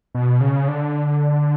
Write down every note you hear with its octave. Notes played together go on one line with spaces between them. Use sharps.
B2
C#3
D3